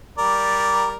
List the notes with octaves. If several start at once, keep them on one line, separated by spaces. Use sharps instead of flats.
G3 A#4 D5